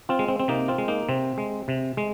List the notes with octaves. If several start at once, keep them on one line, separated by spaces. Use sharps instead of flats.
C4 F4
G#3
C4
C4
C3 A#3 D#4
C4 F4
G#3
A#3 D#4
C3 C4
G#3
C3
G#3